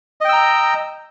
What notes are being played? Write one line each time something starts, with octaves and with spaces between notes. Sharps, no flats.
D#5 G5 A#5 E6